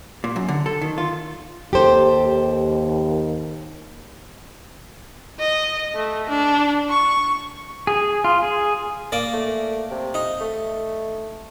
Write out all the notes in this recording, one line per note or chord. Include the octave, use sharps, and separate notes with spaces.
A#2
F#2
D3
A4
D#3
F4
D#2 G4 A4 C5
D#5
A3
D4
C#6
G#4
F4
G#4
A#3 D5
A3
C3
D#4
A3